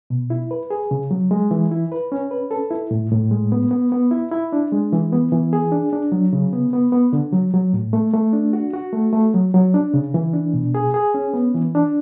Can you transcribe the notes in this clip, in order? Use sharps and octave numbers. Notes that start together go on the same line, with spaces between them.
B2
E4
B4
G#4
C#3
F#3
G#3
E3
E4
B4
C#4
B4
A4
E4
A2
A2
G#3
B3
B3
B3
E4
E4
D4
G#3
E3
B3
E3
G#4
D4
D4
F#3
C#3
B3
B3
B3
D3
F#3
F#3
A2
A3
A3
D4
F#4
F#4
A3
A3
F#3
F#3
D4
C#3
E3
D4
B2
G#4
G#4
C#4
B3
E3
D4